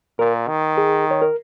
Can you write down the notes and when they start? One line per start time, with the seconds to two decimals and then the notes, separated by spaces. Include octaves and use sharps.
0.19 A#2 A#4
0.48 D#3
0.78 G#4
1.11 C#5
1.22 A#4